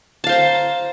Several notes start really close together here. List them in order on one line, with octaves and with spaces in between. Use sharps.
A5 F5 C5 A#5